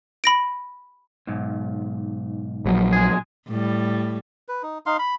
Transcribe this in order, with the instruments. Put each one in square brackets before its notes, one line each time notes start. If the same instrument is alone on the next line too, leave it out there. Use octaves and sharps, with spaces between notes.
[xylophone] B5 A#6 D7
[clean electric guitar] B1 G#2
[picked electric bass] A#1 F#3
[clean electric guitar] G#3 G#4
[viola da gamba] A2 G3
[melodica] B4
D#4
D#4 F5 C6
B5